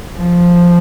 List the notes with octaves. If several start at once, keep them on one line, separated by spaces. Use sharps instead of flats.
F3